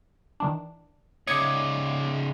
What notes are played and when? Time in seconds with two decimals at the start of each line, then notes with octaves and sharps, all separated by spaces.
0.40 D#3 E3 D4
1.27 C#3 D#4 C#5 D6 D#6 G#6 C#7